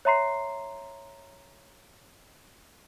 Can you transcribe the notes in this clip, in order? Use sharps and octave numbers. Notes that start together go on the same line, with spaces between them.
C#5 E5 A#5 C6 C7